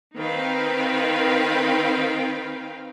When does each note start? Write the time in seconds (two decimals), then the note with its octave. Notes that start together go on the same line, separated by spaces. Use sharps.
0.18 D#3 C4 D#4 B4 F5 G5